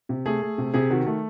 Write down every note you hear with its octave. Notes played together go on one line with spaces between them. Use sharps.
C3
A3 G#4
A3
C3
C3 G#4
D#3 F#4
A3